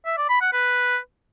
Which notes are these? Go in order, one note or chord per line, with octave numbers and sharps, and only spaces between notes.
E5
D5
B5
F#5
B4